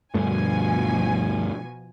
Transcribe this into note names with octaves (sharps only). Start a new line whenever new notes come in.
D2 G2 B2 F3 A3 G#5